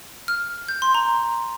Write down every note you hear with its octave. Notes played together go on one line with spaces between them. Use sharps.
F6
G6
C6
A#5